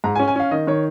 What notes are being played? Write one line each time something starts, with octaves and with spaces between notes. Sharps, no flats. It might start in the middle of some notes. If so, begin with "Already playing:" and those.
G#2 A#5
G#5
C#4
G#5
C#4 F5
D#3 D#5
D#3 C#5